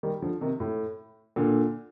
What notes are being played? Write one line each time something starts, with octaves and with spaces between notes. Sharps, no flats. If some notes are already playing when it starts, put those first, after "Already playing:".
D#3 G3
D3 F3
C3 D#3
A2
A#2 D3